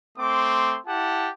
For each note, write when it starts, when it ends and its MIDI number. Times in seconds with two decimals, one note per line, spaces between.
0.18 0.77 57
0.18 0.77 60
0.18 0.77 84
0.18 0.77 86
0.87 1.30 64
0.87 1.30 67
0.87 1.30 78
0.87 1.30 81